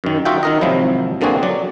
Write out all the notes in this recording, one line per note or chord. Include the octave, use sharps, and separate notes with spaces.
F#2 D#3
D#4 F4 F#4 E5 F#5 G5
D#3 A#4 D#5
G#1 C3 F3 F#3 E4
B2 D3 A#3 C4 F#4 G#4
F#3 D5